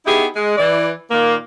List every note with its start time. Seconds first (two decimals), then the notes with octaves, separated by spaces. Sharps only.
0.05 B3 D#4 E4 G4 G#4
0.35 G#3
0.57 E3 D5
1.11 A#2 D#3 A#3